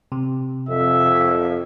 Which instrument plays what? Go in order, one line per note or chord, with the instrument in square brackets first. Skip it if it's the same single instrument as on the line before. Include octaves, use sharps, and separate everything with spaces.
[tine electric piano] C3
[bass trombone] F2 [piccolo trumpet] E5